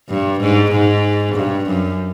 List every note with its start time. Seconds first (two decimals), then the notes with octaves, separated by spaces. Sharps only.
0.08 G2
0.40 G#2
0.72 G#2
1.35 G2
1.66 F#2